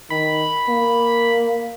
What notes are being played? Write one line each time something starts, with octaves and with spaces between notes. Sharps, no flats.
D#3 B5
A#3